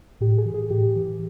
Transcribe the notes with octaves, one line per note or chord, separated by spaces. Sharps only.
A2 G4
G#4
E3
G#4
A2 G4
E3